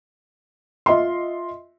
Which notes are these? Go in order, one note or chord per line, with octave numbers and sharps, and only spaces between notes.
F4 D#5 E5 C6